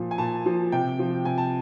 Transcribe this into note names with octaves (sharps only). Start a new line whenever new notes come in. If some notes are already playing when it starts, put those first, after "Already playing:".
Already playing: A#2 F3
G#5
A#2 A5
F3
C3 G5
F3
C3 G#5
A5